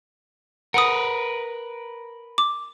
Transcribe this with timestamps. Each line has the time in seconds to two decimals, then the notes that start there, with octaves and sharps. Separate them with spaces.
0.74 A#4 B4 F#5 D#6
2.38 D6